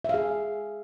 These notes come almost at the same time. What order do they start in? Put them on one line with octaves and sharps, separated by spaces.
E5 F5 G#4